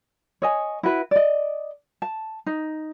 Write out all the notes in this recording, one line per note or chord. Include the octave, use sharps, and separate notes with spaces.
C#5 D#5 G#5
E4 F#4 B4
D5 D#5
A5
D#4